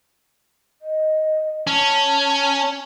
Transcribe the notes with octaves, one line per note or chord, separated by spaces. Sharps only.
D#5
C#4 A5